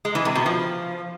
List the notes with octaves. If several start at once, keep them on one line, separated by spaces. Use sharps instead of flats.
G#3
E3
C3
B2
F3